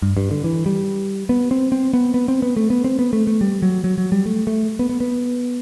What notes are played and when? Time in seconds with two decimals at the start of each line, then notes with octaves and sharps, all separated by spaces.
0.02 G2
0.17 G2
0.31 D3
0.44 E3
0.66 G3
1.29 B3
1.51 C4
1.72 C4
1.93 B3
2.14 B3
2.28 C4
2.42 B3
2.57 A3
2.70 B3
2.84 C4
2.99 B3
3.13 A3
3.27 A3
3.41 G3
3.62 F#3
3.84 F#3
3.98 F#3
4.12 G3
4.26 A3
4.47 A3
4.79 B3
4.89 B3
5.00 B3